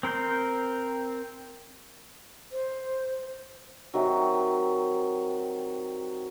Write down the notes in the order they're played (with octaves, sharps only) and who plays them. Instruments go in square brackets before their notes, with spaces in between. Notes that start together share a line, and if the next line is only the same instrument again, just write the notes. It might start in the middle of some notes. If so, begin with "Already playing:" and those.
[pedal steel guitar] C4 A#4 C5 G6
[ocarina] C5
[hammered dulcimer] C3 D#3 F#3